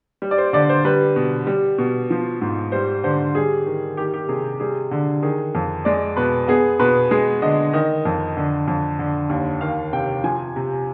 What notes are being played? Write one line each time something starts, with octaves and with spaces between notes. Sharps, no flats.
G3
D5
C5
D3 D5
C5
G3 B4
B2
G3
B2
F3
G#2
G3 C5
D3 C5
G3 G#4
D#3
D#3 G4
G4
C3 G#4
G3 G#4
D3
D#3 G#4
F2
G#3 D5
B2 B4
B3 G#4
B2 B4
G#3 G#4
D3 D#5
D#3 D#5
F2
D3
F2
D3
D#2
D#3 F5
C3 G5
F3 G#5
C3